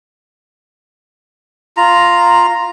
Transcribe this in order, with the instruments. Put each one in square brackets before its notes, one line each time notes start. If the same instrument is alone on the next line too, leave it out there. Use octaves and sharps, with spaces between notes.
[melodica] F4 A#5